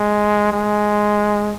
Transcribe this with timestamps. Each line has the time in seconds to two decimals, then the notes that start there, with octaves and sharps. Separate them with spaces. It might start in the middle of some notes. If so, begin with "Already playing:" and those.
Already playing: G#3
0.52 G#3